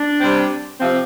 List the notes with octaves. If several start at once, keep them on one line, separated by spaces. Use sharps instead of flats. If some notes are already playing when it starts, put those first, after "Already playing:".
Already playing: D4
C3 G3 C4
C3 F3 C4